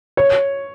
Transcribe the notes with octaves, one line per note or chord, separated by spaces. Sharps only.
C#5